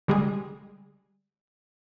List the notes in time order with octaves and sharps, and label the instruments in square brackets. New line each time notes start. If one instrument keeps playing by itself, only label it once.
[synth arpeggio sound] D3 G3 G#3 G#4